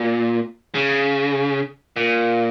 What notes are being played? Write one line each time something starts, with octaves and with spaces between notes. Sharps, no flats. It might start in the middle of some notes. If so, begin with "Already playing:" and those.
Already playing: A#2
C#3
A#2